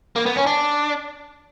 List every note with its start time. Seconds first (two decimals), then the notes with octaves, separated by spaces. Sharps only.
0.16 A#3
0.26 B3
0.36 C#4
0.47 D4